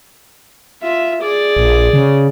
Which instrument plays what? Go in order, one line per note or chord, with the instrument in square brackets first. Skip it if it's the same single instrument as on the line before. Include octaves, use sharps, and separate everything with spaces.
[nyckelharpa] F4 E5
G#4 D5
[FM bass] A#1
C#3